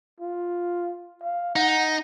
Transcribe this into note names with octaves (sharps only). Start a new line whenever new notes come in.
F4
F5
D#4 F#5